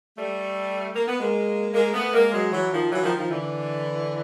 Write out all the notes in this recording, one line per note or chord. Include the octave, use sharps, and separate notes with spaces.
G3 A3
A#3
B3
G#3 A#3
G#3 A#3
A3 B3
G#3 A#3
F#3 G#3
E3 F#3
D#3 F3
E3 F#3
D#3 F3
D#3 F3
D3 E3